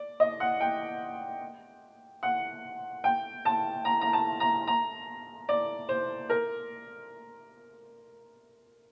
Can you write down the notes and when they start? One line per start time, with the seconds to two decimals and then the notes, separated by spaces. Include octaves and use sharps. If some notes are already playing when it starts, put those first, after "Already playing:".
Already playing: D5
0.20 D#5
0.40 F#5
0.60 G5
2.23 F#5
3.04 G5
3.45 A5
3.85 A#5
4.01 A#5
4.13 A5
4.40 A#5
4.67 A#5
5.49 D5
5.89 C5
6.30 A#4